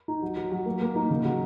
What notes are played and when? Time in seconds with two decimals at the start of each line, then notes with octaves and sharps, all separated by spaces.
0.08 D#4
0.22 F#3
0.37 F#3
0.52 F#3
0.66 A#3
0.81 A#3
0.96 D#4
1.10 C#3
1.25 F#3